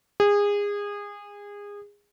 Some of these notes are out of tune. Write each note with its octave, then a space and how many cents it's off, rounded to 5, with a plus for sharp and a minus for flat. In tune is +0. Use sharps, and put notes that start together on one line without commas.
G#4 -25